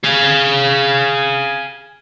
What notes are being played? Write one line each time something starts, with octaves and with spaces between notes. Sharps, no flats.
G#4 F5